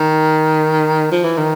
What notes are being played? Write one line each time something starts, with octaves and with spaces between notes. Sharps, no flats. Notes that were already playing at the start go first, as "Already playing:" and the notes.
Already playing: D#3
F3
E3
D#3